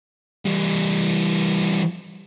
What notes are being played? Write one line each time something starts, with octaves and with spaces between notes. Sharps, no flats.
E3 G3